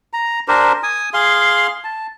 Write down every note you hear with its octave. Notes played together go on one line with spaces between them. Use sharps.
A#5
D4 G4 A#4 C5
G#5 D#6
G#4 F5 C6
A5